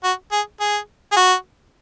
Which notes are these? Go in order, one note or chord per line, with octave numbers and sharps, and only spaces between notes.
F#4
G#4
G#4
G#4
F#4